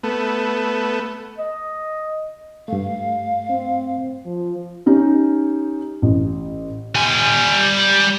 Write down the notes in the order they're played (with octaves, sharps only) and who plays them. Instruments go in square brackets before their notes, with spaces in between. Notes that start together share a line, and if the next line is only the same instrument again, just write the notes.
[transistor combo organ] A3 B3
[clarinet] D#5
[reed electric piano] G2 A3 [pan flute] F5
[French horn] C4
F3
[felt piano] C#4 D#4 G4
A1
[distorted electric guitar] G3 G#5